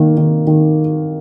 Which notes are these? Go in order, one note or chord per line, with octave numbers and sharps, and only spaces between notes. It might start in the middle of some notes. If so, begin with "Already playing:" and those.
Already playing: D#3 A#3
D#3
D#3